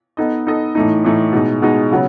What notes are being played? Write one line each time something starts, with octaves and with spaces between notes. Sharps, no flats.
B3 D#4 A4 D#5
B3 D#4 A4 D#5
A2 E3 A3 D#4
A2 E3 A3 D#4
B2 G#3 D#4
B2 G#3 D#4
C#3 F#3 B3